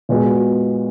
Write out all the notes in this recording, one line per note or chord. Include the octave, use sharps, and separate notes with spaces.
A#2 G#3 B3 F#4